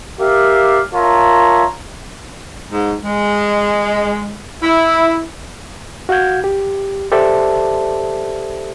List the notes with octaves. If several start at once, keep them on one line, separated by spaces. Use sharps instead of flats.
G4 A#4 D5 E5 F5
F4 A#4 C#5 E5 A5 A#5
G#2
G#3
E4
F#4 F5 F#5 G6 G#6
G4
G4 A4 C5 D5 E5 A5